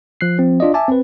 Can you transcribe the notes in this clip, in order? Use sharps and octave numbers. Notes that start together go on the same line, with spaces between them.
F3 F#6 C7
F3 C4
D4 F4 D5 D#5
E5 G#5 A5 D6
C4 B4